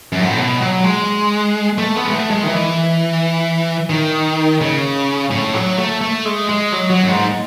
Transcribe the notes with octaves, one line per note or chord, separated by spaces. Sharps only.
F#2
G#2
A2
B2
F#3
G#3
A3
B3
G#3
A3
G#3
D#3
E3
D#3
C#3
A2
F#3
A3
A3
G#3
G#3
F#3
F#3
F#2
G#2